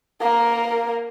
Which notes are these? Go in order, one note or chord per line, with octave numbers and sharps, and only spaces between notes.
A#3 A#4